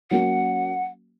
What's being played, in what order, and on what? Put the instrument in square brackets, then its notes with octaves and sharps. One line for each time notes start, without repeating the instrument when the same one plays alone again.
[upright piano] F#3 A#3 C#4 F#4 [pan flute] F#5